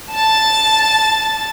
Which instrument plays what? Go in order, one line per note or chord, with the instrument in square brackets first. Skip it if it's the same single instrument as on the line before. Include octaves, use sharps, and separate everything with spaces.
[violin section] A5 A6